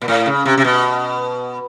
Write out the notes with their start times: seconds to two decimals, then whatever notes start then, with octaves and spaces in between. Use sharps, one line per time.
0.02 A#2
0.08 A2
0.26 C#3
0.46 C3
0.58 C3
0.64 B2